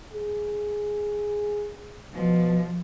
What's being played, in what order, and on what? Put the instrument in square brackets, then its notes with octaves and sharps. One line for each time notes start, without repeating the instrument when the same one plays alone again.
[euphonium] G#4
[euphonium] B2 [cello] F3